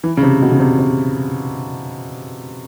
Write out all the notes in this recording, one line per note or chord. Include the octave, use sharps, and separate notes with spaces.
E3
C#3
C3
B2
C#3
C3
C3